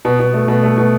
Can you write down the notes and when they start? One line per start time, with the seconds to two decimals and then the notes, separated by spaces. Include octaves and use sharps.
0.05 B2
0.20 B2
0.34 A3
0.48 B2
0.63 A3
0.77 B2